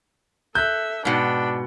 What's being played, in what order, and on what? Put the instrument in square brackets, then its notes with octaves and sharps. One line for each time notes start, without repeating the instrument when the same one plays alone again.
[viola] A4 E5 [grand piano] F#6 G6
[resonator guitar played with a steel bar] G#2 B2 [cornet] D4 [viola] G5 B5